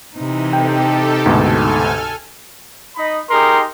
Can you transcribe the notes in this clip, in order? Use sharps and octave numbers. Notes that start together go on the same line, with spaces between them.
C3 E3 D#4
G4 A4 G5
D2 G#2 B2 A4 G#5 F6
D#4 D#5 B5
D#4 G4 G#4 A#4 C6